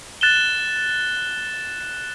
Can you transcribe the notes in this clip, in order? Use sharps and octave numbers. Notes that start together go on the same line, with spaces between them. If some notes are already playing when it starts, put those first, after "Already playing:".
F#6 A6 E7 G7